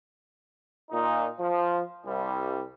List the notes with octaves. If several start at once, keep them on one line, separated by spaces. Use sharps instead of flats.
A#2 D#4
F3
C2 G3